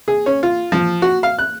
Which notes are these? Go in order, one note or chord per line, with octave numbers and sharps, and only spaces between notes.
G#4
C#4
F4
F3
F#4
F5
F#6